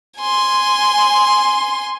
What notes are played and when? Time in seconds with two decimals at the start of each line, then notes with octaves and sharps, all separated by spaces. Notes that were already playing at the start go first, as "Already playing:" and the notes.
0.20 G#5 C6